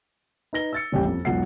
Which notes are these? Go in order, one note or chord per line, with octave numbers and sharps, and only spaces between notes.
D#4 B4 A#6 G7
E6 A6 C#7
D#1 A1 G3 G5
F2
E1 B1 F4 F#5 C7